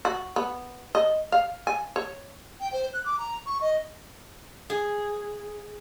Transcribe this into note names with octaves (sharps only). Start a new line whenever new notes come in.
F#4
B3
D#5
F5
G#5
C#5
G5
C5
F#6
D6
A#5
C#6
D#5
G#4